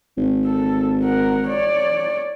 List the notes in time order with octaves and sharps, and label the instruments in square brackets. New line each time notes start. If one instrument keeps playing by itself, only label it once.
[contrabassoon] G#1
[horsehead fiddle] A4
A#4 F#5
C#5 D5